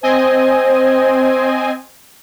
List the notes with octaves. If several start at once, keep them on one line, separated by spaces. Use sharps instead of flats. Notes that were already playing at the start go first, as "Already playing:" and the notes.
C4 C5 D#5 G#5